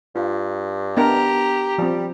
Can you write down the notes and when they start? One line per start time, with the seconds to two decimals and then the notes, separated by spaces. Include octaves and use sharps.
0.16 G2 F4
0.97 B3 D4 G4 A#4 A#5
1.78 F3 G3 C4